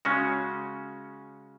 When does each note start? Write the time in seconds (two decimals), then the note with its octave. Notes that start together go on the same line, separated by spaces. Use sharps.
0.05 C#3 G#3 C#4 F#4